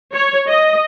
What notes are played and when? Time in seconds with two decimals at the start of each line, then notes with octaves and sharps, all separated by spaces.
0.14 C#5
0.49 D#5